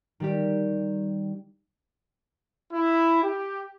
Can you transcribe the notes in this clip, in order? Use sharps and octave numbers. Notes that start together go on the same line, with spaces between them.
D#3 G3 G4
E4
G4